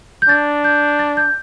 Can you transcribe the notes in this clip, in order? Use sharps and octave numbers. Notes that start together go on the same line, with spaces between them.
G6
D4 A6
G6
A6
G6